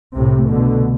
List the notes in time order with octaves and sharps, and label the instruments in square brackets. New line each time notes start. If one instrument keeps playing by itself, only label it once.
[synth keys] C2 [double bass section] A2 C3
[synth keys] A3
[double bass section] B2 D3
[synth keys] C3